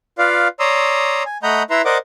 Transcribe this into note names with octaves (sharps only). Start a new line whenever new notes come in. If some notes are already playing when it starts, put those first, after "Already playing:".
F4 B4 D5 F5
C#5 D5 A#5 C6 D#6 E6
G#5
A3 D#5 F#5 A#5 B5 G6
E4 B4 E5 A#5 C6 E6
A#4 C5 D5 D#5 F#5 D6